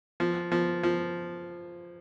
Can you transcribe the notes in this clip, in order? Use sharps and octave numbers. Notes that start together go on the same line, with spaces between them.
F3
F3
F3